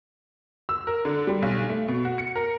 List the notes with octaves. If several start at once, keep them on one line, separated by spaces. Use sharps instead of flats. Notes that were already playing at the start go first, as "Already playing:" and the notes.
E6
A#4
D3
G3
B1
A3
B2
F#4
C#7
A#4